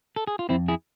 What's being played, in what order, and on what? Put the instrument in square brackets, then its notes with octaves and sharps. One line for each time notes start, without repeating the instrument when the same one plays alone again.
[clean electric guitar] A4
G#4
F4
F2 C4 E4
E4 G#4